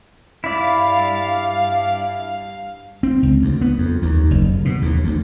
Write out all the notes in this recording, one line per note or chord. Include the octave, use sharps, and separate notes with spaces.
G2 E4 D5 F5
C4
C#2
D2
B3
F2
D#2
F#1
B2
D#2
D2